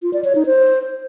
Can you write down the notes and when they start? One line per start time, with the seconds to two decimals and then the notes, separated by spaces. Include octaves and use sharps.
0.02 F4
0.13 D5
0.24 C#5
0.35 D#4
0.46 C5